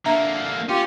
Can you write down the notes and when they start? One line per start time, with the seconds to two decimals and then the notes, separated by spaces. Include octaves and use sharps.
0.06 D3 A#3 D4 E5 A#5
0.69 C#4 F4 G4